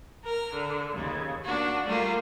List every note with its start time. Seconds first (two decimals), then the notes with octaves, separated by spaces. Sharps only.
0.23 A#4 F6
0.52 D3
0.92 D#2 C#3
1.45 A#3 D4 F#4
1.84 G3 A3 A#3 F4